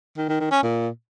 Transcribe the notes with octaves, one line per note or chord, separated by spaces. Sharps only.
D#3
D#3
D#3
C#4
A#2